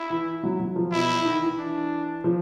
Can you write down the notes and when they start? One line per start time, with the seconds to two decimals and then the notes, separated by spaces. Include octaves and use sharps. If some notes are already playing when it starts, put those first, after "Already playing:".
Already playing: E4
0.10 E3
0.44 F#3
0.60 F#3
0.76 F3
0.92 B2 E4
1.21 E3
1.25 D#3
1.42 E3
1.59 D4
2.24 F3